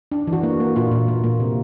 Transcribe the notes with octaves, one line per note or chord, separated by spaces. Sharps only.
D4
E3
F#4
A#3
A#3
A#2 F4
A#2
A#2
A#3
C3